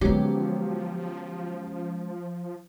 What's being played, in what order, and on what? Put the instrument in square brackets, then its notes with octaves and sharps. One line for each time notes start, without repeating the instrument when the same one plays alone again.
[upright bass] D3 B3 [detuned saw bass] F3 [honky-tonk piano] F#3 G4 [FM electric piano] G#3 C#4